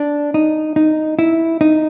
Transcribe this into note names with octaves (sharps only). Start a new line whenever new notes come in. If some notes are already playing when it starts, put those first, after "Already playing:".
Already playing: D4
D#4
D#4
E4
D#4